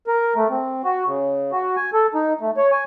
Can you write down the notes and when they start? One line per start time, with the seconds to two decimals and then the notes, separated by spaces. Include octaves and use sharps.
0.07 A#4
0.36 A3
0.50 C4
0.84 F#4
1.06 C#3
1.52 F#4
1.76 G#5
1.93 A4
2.14 D#4
2.41 A3
2.57 C#5
2.72 G#5